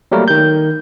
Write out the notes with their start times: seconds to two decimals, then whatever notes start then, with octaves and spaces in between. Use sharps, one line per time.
0.12 F#3 G3 A3 A#3 A#4
0.28 D#3 G6